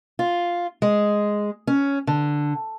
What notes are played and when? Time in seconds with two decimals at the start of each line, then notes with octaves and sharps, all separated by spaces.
0.19 F4
0.82 G#3
1.67 C#4
2.07 D3